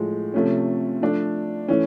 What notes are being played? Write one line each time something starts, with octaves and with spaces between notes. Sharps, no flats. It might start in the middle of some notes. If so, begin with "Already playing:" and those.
Already playing: A2 F3 G#3
C3 F3 A3 C#4
F3 A3 D4
E3 A3 C#4